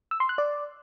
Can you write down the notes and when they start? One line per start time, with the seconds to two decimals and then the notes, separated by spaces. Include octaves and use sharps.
0.11 E6
0.20 C6
0.29 F#6
0.38 D5